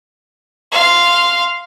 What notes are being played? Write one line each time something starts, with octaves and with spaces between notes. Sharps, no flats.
F5 C6